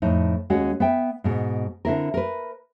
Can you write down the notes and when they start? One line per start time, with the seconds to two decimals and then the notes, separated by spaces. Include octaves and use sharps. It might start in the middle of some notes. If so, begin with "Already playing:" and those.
0.02 F2 A2 D#4
0.50 D#2 G#3 C#4 F#4 F#5
0.80 B3 E5 G5
1.24 G#2 B2
1.85 D3 C4 E4 A#4
2.14 A#4 B4